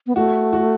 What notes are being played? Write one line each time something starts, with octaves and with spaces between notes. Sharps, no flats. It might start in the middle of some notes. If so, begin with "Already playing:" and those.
B3
A3 F#4
F#4